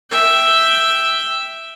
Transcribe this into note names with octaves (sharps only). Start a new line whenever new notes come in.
E5 G5